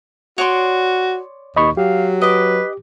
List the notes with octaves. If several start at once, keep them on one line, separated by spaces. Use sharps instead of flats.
F#4 C#5 D5 C6
D#2 D#5 B5 C#6
F#3 G4 F5
B4 D#5 D6